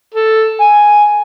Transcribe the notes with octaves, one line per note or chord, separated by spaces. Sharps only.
A4
G#5